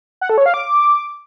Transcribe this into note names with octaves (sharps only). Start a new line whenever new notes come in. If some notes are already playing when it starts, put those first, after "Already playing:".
F#5
A4
C#5
F5
D6